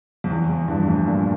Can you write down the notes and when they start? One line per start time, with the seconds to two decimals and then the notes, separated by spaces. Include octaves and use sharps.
0.24 F2
0.30 E2
0.50 F2
0.68 E2 G2
0.87 F2 A2
1.07 G2 A#2